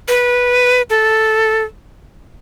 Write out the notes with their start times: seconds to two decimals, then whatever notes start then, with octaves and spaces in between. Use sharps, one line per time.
0.08 B4
0.90 A4